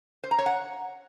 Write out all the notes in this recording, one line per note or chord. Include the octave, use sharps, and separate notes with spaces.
C5
A#5
C#5
F#5